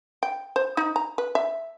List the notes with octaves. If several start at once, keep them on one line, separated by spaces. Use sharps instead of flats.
G5
C5
D#4
A#5
B4
E5